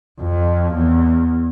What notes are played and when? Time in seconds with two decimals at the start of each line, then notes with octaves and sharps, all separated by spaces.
0.21 F2
0.74 E2